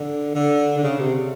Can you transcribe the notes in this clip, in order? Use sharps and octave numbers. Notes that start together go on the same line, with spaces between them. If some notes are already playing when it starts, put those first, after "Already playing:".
Already playing: D3
D3
D3
C#3
C3